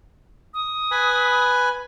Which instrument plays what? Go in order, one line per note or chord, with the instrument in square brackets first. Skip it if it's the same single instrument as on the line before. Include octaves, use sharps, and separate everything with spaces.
[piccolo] D#6
[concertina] B4 G#5 B5